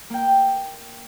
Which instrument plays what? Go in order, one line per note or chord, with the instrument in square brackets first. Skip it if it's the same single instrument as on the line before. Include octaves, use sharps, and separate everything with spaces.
[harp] A#3 G5